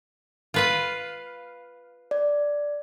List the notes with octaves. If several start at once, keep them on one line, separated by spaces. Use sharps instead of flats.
F4 B4 F5
D5